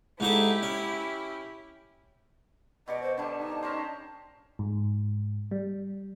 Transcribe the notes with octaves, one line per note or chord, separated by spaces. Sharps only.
G#2 D#4 E4 G4 A4
C#4
B2 D5 D#5 C#6
C5
D3 G3 D4 G#5 A5
D#4
C#4 A#4 C5 A5
G#2
G3